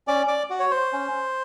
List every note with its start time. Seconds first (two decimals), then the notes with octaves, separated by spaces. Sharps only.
0.08 C#4 D5
0.28 D5
0.50 F#4
0.59 C#5
0.71 C5
0.93 C#4